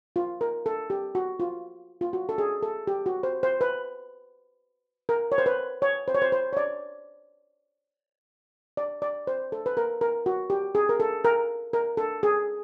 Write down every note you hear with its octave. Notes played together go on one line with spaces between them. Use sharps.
F4
A#4
A4
G4
F#4
F4
F4
F#4
A4
G#4
A4
G4
F#4
C5
C5
B4
A#4
C#5
C5
B4
C#5
C5
C#5
C5
C5
C#5
D5
D5
D5
C5
A4
B4
A#4
A#4
F#4
G4
G#4
A#4
A4
A#4
A#4
A4
G#4